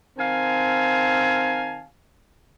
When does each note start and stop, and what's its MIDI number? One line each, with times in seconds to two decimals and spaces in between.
0.18 1.85 51
0.18 1.85 60
0.18 1.85 77
0.18 1.85 80
0.18 1.85 81